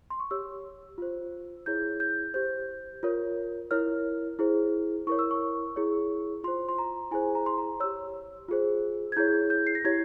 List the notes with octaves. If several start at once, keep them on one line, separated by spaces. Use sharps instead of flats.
C6
C#6
G4 C#5 E6
F4 C5
E4 G#4 C#5 G6
G6
G4 C5 G6
F4 A#4 C#5
E4 A#4 C#5 F6
E4 G#4 C5
E4 A#4 C#5 C#6
E6
C#6
E4 G#4 C#5
F4 C5 C6
C6
A#5
E4 G#4 C5 G#5
A#5
C6
A#5
G4 C#5 E6
F4 G#4 C5
G#6
E4 G#4 C#5 G6
G6
C7
A#6
E4 G4 C#5 G#6